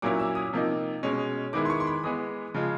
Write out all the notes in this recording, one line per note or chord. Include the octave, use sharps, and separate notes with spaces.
A#2 F#3 A#3 C#4 E4 D6
E6
D#6
C3 F3 A#3 D#4
B2 G#3 C#4
D#3 G#3 B3 E4 D6
C6
C#6
C6
B5
E3 G#3 B3 D#6
C#3 F3 G#3